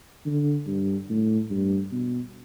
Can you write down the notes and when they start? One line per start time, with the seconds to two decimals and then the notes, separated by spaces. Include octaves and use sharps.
0.26 D3
0.67 G2
1.10 A2
1.51 G2
1.92 B2